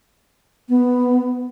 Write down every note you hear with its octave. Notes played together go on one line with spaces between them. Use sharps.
B3